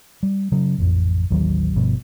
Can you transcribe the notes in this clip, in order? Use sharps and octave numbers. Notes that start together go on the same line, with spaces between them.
G3
C#3 F#3
A1 F2
A1 D#2 D#3 F#3
G1 G2 B2 F3